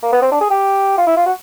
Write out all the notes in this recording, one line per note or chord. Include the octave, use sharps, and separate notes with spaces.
A#3
B3
C4
D4
G#4
G4
F4
E4
F4
F#4